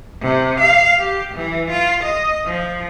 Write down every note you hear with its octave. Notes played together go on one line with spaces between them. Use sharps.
C3
F5
G4
E3
F4
D#5
F3